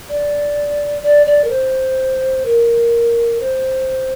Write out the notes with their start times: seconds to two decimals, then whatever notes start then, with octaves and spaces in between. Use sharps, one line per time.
0.09 D5
1.03 D5
1.26 D5
1.44 A#4
1.50 C5
2.45 A#4
3.40 C5